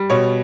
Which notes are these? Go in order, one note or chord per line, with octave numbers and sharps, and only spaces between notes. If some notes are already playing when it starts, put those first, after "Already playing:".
Already playing: G3
B2 C#5